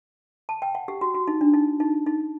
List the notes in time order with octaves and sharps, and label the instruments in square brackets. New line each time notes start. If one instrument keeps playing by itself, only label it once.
[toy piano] A5
G5
F#5
G4
F#4
F#4
D#4
D4
D#4
D#4
D#4